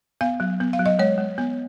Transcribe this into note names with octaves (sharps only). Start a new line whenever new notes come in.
B3 F5
F#3
B3
F5
F#3
D#5
G#3 C#5
G#3
B3